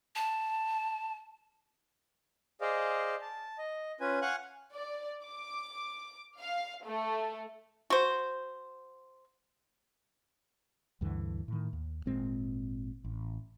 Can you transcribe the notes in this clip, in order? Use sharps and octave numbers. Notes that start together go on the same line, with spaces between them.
A5
G#4 C5 D5 D#5 F5
A5
D#5
C#4 F4 B4 G#5
F5 F#5 G#5 C#6 F#6
D5
D6
F5
A3
F#4 C5
D2 G2 D3 E3
A2 D#3
D#2
G#1 A#2 G#3 C4
A1